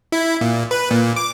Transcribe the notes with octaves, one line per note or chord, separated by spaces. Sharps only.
E4
A#2
B4
A#2
D6